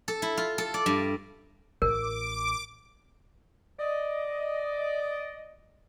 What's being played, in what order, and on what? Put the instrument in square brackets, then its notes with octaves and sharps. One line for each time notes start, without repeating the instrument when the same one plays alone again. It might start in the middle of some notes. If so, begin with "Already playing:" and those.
[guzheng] A4
E4
F4
A4
D5
G2
[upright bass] A1 [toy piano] A#4 [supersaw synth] D6
[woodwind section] D5 D#5